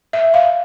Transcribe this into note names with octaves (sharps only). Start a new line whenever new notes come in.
E5
F5